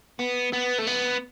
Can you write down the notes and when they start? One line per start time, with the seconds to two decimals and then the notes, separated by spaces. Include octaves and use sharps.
0.20 B3
0.53 B3
0.79 A3
0.87 B3